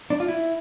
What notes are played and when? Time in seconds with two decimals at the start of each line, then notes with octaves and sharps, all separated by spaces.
0.10 D4
0.20 F4
0.28 E4